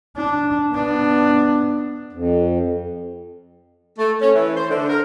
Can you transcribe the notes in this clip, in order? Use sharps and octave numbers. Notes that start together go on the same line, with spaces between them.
D4
B3 D4
F2
A3
C#4
E3
C5
D3
A#4